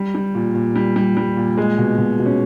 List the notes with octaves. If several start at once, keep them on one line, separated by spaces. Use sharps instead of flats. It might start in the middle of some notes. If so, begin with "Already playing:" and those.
Already playing: G3
G3
A#2
A#2
G3
G3
G3
A#2
G#3
B2
B2
B2
C#4